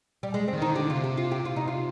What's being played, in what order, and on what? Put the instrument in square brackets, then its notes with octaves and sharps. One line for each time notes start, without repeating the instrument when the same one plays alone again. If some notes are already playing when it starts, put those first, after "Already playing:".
[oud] G3
G#3
C4
[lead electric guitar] D#3
[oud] D#4
[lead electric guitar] D3 [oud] G4
[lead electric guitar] C3 [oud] F4
[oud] G4
F4
G4
F4
D#4
F4